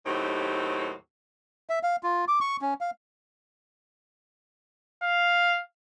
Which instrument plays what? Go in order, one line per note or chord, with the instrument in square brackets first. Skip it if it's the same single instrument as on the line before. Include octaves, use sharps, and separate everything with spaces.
[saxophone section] D#2 A2 F#3 C4 D#4 G4
[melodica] E5
F5
F4
D6
C#6
C#4
F5
[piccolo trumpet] F5